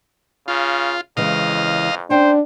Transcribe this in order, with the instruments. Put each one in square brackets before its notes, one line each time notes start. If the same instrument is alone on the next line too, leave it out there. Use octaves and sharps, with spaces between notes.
[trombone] C#3 [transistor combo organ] F4
[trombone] F2 [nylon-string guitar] C#3 E3 G#3 [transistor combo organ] D#5 F5
[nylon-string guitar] C#4 G5 [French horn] D4 [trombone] C5